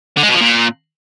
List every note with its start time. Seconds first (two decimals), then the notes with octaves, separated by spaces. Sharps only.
0.17 D3
0.23 G#3
0.29 B2
0.35 F3
0.40 A#2